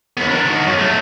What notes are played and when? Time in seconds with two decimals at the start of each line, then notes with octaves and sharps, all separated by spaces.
0.17 D#2 B3
0.29 D4 A#4
0.45 D#3 F#4
0.66 F#2
0.79 F#3 A3